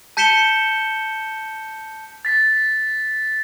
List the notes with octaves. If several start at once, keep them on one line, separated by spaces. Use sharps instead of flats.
A5 G6 B6 C#7 E7 G7
A6 B6